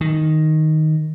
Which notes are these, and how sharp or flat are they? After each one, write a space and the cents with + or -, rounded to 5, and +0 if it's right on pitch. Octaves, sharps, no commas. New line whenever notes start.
D#3 +0